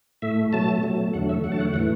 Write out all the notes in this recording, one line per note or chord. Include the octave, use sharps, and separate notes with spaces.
A2 A3 E5
B2 F#3 A3 A5
B2 F#3 A3
E2 D3 F#3 A3 F#5
E5
E2 D3 F#3 A3 F#5
A5
F#5
A2 E3 A3 F#5